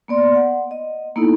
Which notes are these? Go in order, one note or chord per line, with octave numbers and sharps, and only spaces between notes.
A#3 B3 D5 C6
F#5
D#5
A#3 B3 D#4 E4 A4